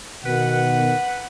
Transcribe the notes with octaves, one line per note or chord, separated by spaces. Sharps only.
B2 D#3 B4 F#5